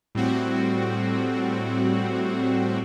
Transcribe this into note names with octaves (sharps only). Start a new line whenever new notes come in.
A2 G3 C4 F#4